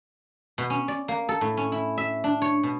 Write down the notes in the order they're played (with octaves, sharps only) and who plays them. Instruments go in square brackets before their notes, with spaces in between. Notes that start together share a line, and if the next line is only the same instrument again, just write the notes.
[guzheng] B2
C#4
D5
A#3
A4
A2
C#4
E4
E5
D4
C#5
B2